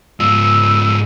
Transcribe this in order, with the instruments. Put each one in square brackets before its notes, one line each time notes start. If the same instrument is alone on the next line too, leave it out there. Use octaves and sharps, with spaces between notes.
[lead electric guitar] G#2 F4 [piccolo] E6